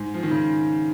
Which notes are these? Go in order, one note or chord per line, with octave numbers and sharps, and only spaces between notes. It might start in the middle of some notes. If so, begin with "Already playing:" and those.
Already playing: G#2
F3
D#3
C#3